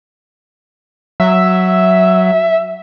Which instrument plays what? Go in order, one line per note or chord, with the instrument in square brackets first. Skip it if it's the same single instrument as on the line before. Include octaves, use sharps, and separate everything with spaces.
[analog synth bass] F#3 [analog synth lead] E5